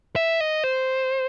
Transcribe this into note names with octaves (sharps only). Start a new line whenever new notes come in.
E5
D#5
C5